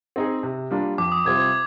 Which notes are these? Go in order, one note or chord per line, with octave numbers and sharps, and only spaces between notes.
C4 D#4 G#4
C3
G3 A#3 D4 F4
F2 D6
D#6
C3 G3 C4 F4 G#6
G#6